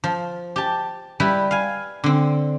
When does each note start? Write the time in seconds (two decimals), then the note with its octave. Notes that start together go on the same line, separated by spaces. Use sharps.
0.04 F3
0.56 G4 A5
1.20 G3 E4 B4 B5
1.51 F5 G#5
2.04 D3 C4